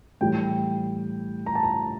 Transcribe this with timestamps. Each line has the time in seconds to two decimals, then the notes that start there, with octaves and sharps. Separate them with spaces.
0.21 A2 E3 G3 G5
1.46 A#5
1.55 A5
1.63 A#5